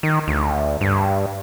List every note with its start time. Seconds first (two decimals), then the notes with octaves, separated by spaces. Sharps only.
0.03 D#3
0.28 D2
0.81 G2